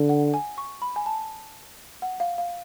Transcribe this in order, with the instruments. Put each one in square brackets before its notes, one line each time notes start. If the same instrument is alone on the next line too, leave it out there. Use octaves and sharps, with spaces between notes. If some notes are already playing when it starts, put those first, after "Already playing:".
Already playing: [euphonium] D3
[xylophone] F#5
G#5
C#6
B5
G#5
A5
F#5
F5
F5